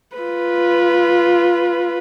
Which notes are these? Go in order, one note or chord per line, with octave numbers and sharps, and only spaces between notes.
F4 B4